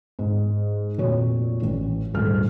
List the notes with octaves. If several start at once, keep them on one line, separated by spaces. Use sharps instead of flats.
G#2
F1 A#2 F#4 C#5
A1
D#1 D2 G#2 F6